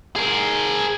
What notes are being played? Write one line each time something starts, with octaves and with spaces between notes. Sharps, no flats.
G#4 A#4